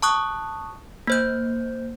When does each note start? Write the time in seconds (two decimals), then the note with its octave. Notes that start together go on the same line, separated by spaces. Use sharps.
0.02 A5 C#6 D#6 F#6
1.07 A#3 C5 G6